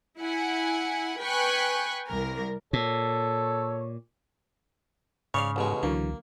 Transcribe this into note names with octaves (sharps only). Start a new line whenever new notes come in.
E4 F#5 G#5
B4 G5 G#5 C#6 F#6
C2 A#4
A#2 A4 C#5
G#2 C#3 C#5 D5 F5
A1 B2 G#3
C#2 D3 E3 F#3 A#3